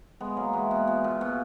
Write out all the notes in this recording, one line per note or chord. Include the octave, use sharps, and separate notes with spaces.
G#3 B3
F#3 A#3
E3 G#3
B2
B2
A#2
B2